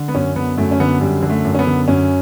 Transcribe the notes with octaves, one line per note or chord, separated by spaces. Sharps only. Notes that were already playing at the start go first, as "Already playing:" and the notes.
Already playing: D3
B3
F#2 C#4
D3 B3
F#2 A3
C#4
D3 B3
F#2 G3
D3
A3
F#2
C#4
B3
D3
F#2 C#4